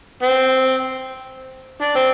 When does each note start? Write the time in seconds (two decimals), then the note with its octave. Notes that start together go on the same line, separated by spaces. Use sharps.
0.23 C4
1.82 D4
1.95 C4